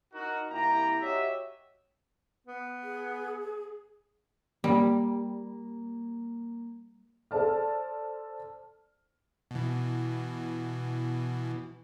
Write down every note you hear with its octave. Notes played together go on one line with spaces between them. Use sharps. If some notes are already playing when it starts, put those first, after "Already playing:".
D#4 F#4 A#4
C2 A#3 E4 G4 G5 A#5
F#4 G4 C#5 D#5 E5
B3
G#4
G3 A#3
A4 C5 D5 A5 F6
B2 E3